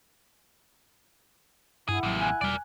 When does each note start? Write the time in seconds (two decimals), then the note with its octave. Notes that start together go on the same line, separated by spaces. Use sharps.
1.88 G2 E4 G#4 F#5
2.03 A1 D#2 C3 F#3
2.20 G#5 F#6
2.41 E1 G3 A#4 D5